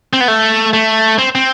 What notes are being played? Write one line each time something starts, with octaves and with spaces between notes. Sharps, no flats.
C4
B3
A3
A3
C4
C4